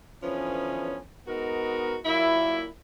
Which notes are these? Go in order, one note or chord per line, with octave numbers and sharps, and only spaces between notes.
D3 E3 F3 B3 C#4
G#3 B3 D#4 F#4 A#4
A#2 F#3 A#3 E4